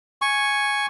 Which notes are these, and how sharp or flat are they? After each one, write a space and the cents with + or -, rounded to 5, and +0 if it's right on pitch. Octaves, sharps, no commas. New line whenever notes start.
G#5 +0 C#6 +0